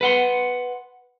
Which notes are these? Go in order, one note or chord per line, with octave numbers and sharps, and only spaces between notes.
B4 F#5 C6